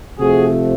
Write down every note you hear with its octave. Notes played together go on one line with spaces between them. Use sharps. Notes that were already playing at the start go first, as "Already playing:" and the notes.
C3 F3 A3 F#4 G#4